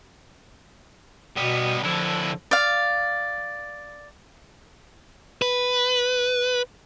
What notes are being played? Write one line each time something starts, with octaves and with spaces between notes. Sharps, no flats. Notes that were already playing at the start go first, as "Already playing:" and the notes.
B2 G3 B3
D3 F3 E4
D5 F5
B4